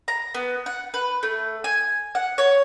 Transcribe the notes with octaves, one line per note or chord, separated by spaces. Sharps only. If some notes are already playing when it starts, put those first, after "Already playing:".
A#5
B3
F#5
B4
A3
G#5
F#5
C#5